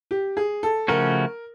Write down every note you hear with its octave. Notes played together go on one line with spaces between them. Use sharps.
G4
G#4
A4
C#3 F3 A3 C#4 F#4 A#4